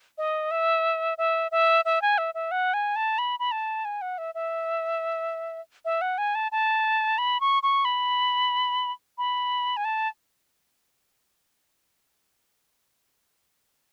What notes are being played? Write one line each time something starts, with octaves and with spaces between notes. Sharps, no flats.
D#5
E5
E5
E5
E5
G#5
E5
E5
F#5
G#5
A5
B5
B5
A5
G#5
F#5
E5
E5
E5
F#5
G#5
A5
A5
B5
C#6
C#6
B5
B5
G#5
A5